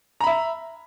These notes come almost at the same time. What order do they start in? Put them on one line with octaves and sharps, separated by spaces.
A#5 B5 E5